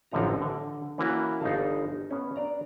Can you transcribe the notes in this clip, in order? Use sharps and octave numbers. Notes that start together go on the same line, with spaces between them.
A1 F#2 D3 F3 D#4 A#5
D3
E3 A#3 C#4 E4 F#4
G1 D#4 F5 A5
B3 C#4
D4 D5 A#5